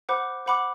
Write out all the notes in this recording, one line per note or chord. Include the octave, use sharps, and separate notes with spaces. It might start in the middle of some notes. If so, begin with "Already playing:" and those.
C5 F#5 B5 D6 F#6
C5 F#5 B5 D6 F#6